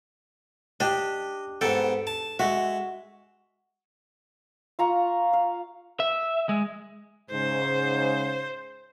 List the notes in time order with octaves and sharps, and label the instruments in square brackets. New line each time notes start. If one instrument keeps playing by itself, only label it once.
[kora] D4 G4 [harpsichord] D#5
[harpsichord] G#2 B3 G5 [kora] A4
[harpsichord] A5
[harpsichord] G#3 E5 [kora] F#4
[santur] F4 A#5 C#6
F5
[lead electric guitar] E5
G#3
[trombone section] G#2 C#3 [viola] C5